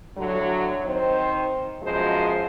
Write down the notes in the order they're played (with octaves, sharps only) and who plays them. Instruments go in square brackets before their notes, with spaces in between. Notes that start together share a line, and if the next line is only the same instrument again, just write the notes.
[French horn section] A2 D3 F#3
D#3 C4 C5
F#2 B2 F3 G#3 C5